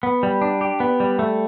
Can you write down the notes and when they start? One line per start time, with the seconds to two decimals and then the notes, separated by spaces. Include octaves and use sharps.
0.03 B3
0.23 G3
0.41 D4
0.61 G4
0.80 B3
1.00 G3
1.19 A3